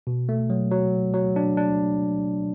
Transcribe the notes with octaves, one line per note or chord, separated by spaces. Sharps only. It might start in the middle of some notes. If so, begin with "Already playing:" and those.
B2
A3
F#3
F#3
F#3
D4
D4